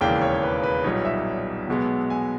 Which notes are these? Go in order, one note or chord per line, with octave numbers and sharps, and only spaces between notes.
E1 D#2 C#3 E3 A#3 G5
C#5
B4
B4
B1 A#2 G3 B3 D#4 C#5
E5
B1 B2 G#3 B3
G#5